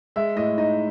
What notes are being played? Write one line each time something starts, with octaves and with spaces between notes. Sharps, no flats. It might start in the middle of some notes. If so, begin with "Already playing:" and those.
G#3 E5
A2 D#5
D#4 D#5